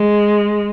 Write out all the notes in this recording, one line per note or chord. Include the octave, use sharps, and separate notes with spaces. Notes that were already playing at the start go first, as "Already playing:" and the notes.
Already playing: G#3